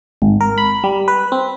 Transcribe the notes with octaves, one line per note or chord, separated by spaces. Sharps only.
G#1
A#4
B5
G3
B4
C4